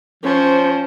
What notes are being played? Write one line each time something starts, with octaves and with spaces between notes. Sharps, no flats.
F3 C#4 C5 C#5